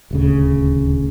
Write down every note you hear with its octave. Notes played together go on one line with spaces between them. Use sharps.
D#1 D2 C#3